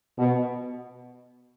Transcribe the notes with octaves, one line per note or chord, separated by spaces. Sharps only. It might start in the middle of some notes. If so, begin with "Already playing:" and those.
B2